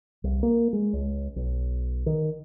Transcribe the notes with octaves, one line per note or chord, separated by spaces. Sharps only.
C2
A#3
G#3
C#2
B1
D#3